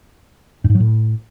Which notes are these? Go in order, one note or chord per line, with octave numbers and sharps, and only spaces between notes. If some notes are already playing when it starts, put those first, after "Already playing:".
G2
G#2
F#3
A2